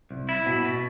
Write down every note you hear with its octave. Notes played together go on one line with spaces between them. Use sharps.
C2
E4
B2
B2